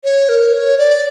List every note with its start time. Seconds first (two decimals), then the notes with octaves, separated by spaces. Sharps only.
0.04 C#5
0.29 A#4
0.53 C#5
0.78 D5